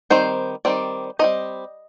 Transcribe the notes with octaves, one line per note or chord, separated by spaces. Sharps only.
D#3 G3 C4 C5
D#3 G3 C4 D5
G3 C4 D#4 D#5